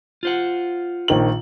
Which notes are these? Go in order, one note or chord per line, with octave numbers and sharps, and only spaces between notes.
F4 C5 F#5
A#1 D#3 F#7